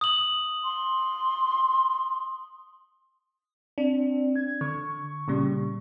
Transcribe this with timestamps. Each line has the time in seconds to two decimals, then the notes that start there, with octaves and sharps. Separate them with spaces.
0.01 D#6 F#7
0.64 C6
3.78 C4 D4
4.36 G#6
4.61 D3 C#6
5.28 A#2 C#3 G3